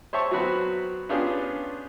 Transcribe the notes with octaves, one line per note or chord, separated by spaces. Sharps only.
C5 C#5 E5 A5 C#6
F#3 B3 C4 F#4 B5
B3 C#4 D4 F4 G4 G#4